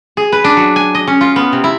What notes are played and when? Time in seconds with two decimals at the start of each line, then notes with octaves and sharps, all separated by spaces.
0.17 G#4
0.32 B4
0.44 D4
0.57 F#3
0.76 G#5
0.95 D#5
1.07 C#4
1.21 F4
1.36 B3
1.52 C3
1.64 E4